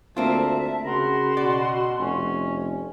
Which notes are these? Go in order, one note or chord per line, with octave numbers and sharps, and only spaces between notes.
D2 A#3 C4 F4 E5 A5
C#3 F#4 A#4 B5 C6
B2 D5
F1 C#4